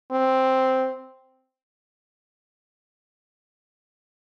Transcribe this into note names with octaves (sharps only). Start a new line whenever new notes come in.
C4